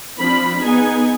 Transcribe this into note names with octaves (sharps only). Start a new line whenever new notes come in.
F3 C4 D4 B5
B3 D#4 G#4 G#5